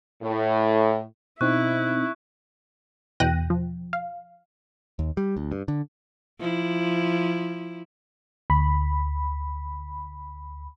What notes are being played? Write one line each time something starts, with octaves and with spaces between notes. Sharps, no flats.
A2
B2 C4 D#4 E4 C#6 F#6
E2 B2 G5 F#6 A#6 D#7
F3
F5
D#2
G3
D2
G2
D3
F3 E4
D2 B5